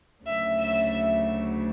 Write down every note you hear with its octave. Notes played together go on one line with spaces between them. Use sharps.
D2 C#3 F#3 E5
E5